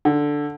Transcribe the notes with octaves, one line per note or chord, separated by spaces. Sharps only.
D3